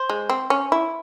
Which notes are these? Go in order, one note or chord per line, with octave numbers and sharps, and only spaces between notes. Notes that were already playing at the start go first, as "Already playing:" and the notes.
Already playing: C5
G#3
C4
C#4
E4